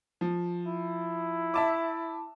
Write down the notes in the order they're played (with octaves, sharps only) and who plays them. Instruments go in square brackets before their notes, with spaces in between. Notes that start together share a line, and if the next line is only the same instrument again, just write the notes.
[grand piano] F3
[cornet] E4
[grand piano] E5 A5 D6